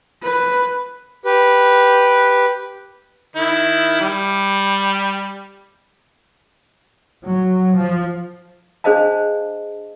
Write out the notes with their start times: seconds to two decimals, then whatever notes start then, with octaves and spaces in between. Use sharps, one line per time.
0.23 B4
1.25 G4 B4
3.36 D#3 E4
4.00 G3
7.26 F#3
7.76 F3
8.84 D4 G#4 C5 D#5 F5 A5